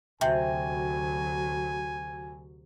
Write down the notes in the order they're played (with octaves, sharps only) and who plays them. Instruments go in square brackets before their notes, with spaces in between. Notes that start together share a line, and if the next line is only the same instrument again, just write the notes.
[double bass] D2 F#3 [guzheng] C3 [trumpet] G#5